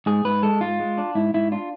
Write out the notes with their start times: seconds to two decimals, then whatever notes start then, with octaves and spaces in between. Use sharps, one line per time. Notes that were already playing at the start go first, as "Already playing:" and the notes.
0.06 G#2 G#4
0.25 G#2 B4
0.43 G#3 A4
0.61 G#2 F4
0.79 G#3
0.98 D4
1.15 G#2 E4
1.34 G#2 E4
1.52 D4 F4